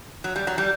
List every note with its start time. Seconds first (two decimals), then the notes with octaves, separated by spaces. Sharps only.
0.24 F#3
0.36 G3
0.47 F#3
0.58 G3